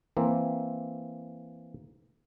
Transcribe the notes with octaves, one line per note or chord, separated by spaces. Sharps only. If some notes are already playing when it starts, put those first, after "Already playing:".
E3 A#3 C4